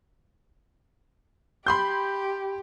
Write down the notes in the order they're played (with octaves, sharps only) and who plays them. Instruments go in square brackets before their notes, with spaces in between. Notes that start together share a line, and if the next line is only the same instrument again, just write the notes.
[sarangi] G4 [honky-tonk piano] B5 C6 G6